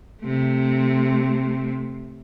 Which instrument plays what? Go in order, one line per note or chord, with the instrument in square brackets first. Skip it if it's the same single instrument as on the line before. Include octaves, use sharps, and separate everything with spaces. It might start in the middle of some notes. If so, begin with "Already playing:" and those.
[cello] C3 A3